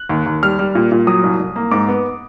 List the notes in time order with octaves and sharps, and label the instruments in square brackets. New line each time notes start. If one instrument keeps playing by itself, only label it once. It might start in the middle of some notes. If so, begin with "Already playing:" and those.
Already playing: [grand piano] F#6
D#2
D#2
G3 F6
G3
A#2
A#2
F#3 D#6
C2
C2
A#3
G#2 D6
B3